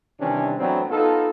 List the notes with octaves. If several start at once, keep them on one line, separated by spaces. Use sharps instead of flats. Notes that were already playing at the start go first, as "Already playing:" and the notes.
C3 D#3 E3 G3 C#4 D4
A2 E3 F#3 B3 C4 D4
B3 D#4 F4 A4